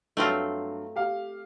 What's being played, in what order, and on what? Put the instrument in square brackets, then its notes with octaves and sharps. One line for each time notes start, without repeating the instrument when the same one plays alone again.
[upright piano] G2 F#3 [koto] A3 C4 F4
[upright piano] G4 F5